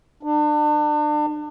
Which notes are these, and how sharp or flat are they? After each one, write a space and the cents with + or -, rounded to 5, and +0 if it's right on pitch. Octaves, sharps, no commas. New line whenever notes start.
D4 +35